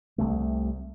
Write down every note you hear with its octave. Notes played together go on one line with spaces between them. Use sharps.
C2 C3 A3